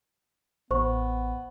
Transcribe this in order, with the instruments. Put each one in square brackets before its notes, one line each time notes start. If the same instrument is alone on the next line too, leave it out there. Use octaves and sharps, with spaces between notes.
[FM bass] A1 [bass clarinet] B3 [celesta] C5 C#6